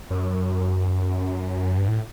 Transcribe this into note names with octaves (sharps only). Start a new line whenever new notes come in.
F#2
G2
A2